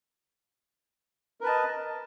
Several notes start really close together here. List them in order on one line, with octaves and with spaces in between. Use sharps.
A#4 B4 A5 D#5